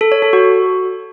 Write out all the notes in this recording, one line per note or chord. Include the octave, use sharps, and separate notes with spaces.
A4
C#5
A4
F#4